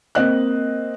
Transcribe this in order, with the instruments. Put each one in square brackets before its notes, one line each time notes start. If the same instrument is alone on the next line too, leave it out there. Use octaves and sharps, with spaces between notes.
[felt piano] A#3 C4 D#5 F#6